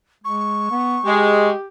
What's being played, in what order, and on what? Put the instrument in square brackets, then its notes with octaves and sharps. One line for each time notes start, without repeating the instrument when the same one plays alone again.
[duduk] G#3 [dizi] C#6
[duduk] B3
[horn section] G#3 [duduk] G4